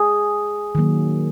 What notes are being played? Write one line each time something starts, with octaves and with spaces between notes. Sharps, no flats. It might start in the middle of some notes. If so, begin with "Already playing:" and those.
Already playing: G#4
D#3 F#3 A#3